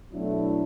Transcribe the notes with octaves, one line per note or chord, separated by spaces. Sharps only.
B2 F#3 A3 D4 E4